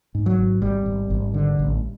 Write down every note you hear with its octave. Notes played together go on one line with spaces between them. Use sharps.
G#2
F#3
G#1
G#1 G3
G#1
G#1
D3
A1